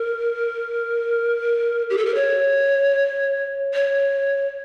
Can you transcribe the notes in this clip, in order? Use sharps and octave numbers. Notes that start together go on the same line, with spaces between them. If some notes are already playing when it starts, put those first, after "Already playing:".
Already playing: A#4
G4
A4
A#4
C#5
C#5